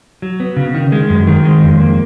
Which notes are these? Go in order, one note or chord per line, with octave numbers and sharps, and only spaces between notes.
F#3
B3
C#3
D#3
G#3
F#2
D#3
G#3
F2
A#3